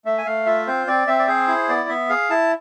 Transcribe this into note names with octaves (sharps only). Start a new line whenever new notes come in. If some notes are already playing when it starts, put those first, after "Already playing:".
A3 E5
G#5
A3 F5
F4 E5
C4 C5
C4 D5
C4 E5
D5
G#4 C5
E4
B3 D5
B3 E5
G#4 F5
E4 A5